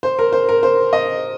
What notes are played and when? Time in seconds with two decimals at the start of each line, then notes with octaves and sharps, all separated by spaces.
0.03 C5
0.19 A#4
0.33 C5
0.49 A#4
0.63 C5
0.93 D#5